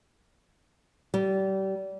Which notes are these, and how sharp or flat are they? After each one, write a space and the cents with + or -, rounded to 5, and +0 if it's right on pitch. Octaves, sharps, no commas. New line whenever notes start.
G3 -30